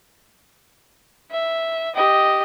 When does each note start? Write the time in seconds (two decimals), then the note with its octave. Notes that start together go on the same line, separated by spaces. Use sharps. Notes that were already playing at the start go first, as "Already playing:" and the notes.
1.32 E5
1.95 G4 D#5